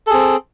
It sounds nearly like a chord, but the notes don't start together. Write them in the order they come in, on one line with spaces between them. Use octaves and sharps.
A4 G#4 C4